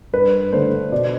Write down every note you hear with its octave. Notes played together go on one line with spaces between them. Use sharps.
G2 B4
D3 A3 C5
B2 D5